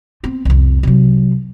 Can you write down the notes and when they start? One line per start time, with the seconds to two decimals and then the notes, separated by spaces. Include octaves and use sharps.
0.24 B3 C4
0.45 C2 F2
0.83 C3 F#3